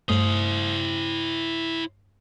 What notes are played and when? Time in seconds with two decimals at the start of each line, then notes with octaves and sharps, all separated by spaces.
0.09 G2 A3 E4 C5 D#6